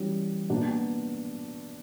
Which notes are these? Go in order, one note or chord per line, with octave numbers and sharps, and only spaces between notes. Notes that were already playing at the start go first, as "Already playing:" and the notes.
Already playing: E3 G3 C#4 F#4
B2 A#3 D4 F#4